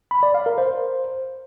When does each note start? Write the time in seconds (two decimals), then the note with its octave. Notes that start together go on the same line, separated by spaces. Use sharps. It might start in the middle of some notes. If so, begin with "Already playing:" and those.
0.11 B5
0.23 D5
0.34 F5
0.46 A#4
0.58 C5